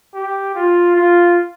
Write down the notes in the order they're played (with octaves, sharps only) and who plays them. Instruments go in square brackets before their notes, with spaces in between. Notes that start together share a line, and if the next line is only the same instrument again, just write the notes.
[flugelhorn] G4
F4
F4